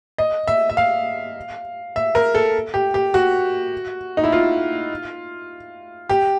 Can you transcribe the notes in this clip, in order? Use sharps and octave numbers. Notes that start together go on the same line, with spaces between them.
D#5
E5
E5
F5
E5
A#4
A4
G4
G4
F#4
D#4
E4
F4
G4